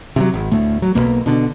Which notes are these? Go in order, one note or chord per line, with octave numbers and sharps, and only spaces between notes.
C3 F3 F#3
G#1
D2 A2 A3
F#3
B1 F2 B2 A#3
B2 D3